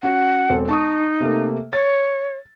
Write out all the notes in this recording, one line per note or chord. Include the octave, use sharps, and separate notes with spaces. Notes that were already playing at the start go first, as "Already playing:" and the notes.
C#4 F#4 F#5
E1 C4 A4
D#4 A5 C#6 D#6
C3 A3 A#3
C#5 A6